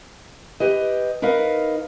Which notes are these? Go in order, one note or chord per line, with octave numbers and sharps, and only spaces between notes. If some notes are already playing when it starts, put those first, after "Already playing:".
G4 B4 D#5
D#4 A#4 B4 D#5 F5